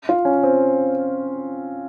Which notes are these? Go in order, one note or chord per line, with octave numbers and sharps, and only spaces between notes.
F4
C#4
C4